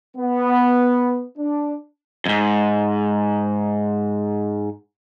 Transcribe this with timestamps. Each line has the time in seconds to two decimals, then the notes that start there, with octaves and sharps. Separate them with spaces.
0.17 B3
1.38 D4
2.26 F2 G#2